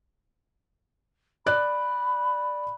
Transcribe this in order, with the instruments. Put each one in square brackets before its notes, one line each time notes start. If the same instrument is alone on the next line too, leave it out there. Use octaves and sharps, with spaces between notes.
[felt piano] D5 F#6 [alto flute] B5